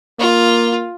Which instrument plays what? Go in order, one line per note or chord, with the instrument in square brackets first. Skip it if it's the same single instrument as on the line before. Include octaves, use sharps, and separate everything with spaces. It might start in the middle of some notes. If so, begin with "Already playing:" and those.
[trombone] A#3 [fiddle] F4